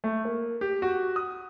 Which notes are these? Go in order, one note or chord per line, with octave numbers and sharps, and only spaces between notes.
A3
A#3
G4
F#4
D#6